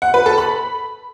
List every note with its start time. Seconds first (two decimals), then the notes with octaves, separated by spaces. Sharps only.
0.02 F#5
0.14 B4
0.26 A4
0.38 B5